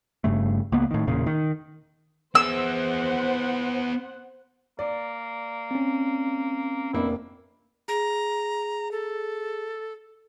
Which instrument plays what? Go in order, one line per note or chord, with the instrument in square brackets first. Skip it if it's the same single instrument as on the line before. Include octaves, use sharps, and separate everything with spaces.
[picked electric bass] G1 G2 C#3 A3
C#2 A#3 B3
A2 D#3
E1 E2 A#2 C#3
D#3
[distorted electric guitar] B3 G#4 [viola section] C5 F#5 [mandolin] E6
[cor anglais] A#3 [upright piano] D5
[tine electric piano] C4 C#4
[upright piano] F1 A#3 D4 [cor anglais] E4
[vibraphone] G#4 [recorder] A#5
[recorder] A4